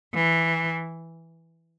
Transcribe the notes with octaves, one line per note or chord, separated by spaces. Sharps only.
E3